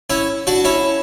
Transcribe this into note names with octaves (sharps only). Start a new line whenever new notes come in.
C#4 E4
D4 F#4
C#4 E4